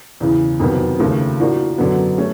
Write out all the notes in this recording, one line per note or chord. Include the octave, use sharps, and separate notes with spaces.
E2 C#3 E3
F2 C3 D#3 F#3 B3
D#2 C#3 F3 A3
A2 F3 A#3 D4 F#4
F#2 D3 F#3 B3
A3 C#4